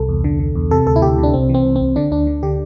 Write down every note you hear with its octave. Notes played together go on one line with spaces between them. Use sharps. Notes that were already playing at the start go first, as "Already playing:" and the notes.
Already playing: C2 A4
E2
D3
D3
E2
C3 A4
D2 A4
E4
D2 G4
C3
D4
C2 C4
E3
C4
C2
C2 C4
D3 D4
D2 D4
D3
D3 G4